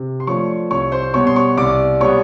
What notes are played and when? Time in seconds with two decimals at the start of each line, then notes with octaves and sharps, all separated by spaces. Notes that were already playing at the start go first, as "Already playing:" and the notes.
Already playing: C3
0.20 C6
0.27 F3 A3 D4 C#5 C#6
0.70 C2 C#5 C#6
0.92 C5 C6
1.14 B2 G3 B3 C#5 C#6
1.27 C6
1.36 C#5 C#6
1.57 C2 D5 D6
2.01 B2 G3 B3 C#5 C#6